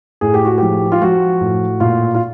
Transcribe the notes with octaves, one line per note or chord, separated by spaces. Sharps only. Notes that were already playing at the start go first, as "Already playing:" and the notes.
A2 G#4
G4
F#4
F3 G4
F4
F3 F#4
A2
A#2 F4
F4